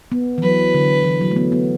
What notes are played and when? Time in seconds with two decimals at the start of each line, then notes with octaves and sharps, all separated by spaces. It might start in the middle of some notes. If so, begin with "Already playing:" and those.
0.12 B3
0.38 E3
0.43 F#3 B4
0.74 D3
1.04 E3
1.21 F#3
1.31 A3
1.36 B3
1.52 B3